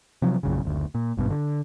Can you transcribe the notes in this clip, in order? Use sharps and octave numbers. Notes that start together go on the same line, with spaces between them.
C3 F3 F#3
A#1 F#2 C#3
F#1 D2
A#2
G#1 G2 B2
D3